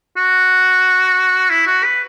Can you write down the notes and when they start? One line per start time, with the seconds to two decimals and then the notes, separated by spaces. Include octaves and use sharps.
0.17 F#4
1.50 E4
1.67 F#4
1.84 B4